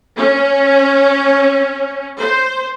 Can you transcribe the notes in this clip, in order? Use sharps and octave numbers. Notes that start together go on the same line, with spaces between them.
C#4
C5